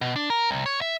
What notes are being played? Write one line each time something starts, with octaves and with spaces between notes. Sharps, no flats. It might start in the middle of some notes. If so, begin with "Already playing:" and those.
B2
D4
A#4
C2
C#5
E5